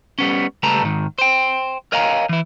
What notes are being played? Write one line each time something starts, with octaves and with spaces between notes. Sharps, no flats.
G3 B3 C#4
C#2 G3 A3 B4 A5 A#5
G#2 D#3
C5 G5
A#4 C#5 D#5 F5 G#5 A#5
E3 E4